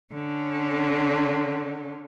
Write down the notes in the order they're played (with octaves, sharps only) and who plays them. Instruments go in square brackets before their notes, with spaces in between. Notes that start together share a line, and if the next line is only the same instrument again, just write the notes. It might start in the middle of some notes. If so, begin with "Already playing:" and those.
[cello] D3 C#4